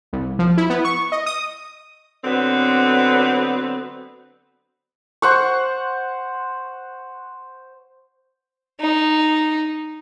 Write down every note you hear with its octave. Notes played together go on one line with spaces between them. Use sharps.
C2
F3
E4
B3
C#6
D#5
D#6
D3 F#3 B3 C4 B4
C5 F#5 C#6
D#4